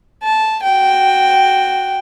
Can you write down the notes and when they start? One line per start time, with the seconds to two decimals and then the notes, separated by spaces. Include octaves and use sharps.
0.24 A5
0.63 F#4 G5